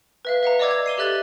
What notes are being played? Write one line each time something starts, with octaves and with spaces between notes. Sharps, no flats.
B4 E5 F5
B4 F5 F#5 A#5
D5 D#5 A#5 D6 E6 G#6
G#6
C7 D#7 G7
G4 A4 E5 F#6 A6 G7